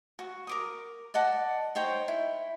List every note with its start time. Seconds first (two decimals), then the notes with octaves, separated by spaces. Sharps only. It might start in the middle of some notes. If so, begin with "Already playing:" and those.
0.19 F#4
0.47 A#4 D6 D#6
1.14 D5 D#5 F#5 A5
1.75 D#4 C5 C#5 G5
2.08 E4